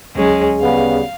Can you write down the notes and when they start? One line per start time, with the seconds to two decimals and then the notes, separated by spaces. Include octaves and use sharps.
0.16 D2 F#3 G#3 C#4 G#4
0.62 C#3 G3 B3 F5